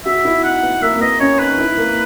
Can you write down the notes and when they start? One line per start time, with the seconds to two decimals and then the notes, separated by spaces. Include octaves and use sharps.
0.05 F#4 E5
0.25 E4
0.44 D#4 F#5
0.63 B3
0.82 A#3 E5
0.95 A#3
1.01 B3 D#5
1.20 C#4 C#5
1.39 D#4 B4
1.58 E4
1.77 A#3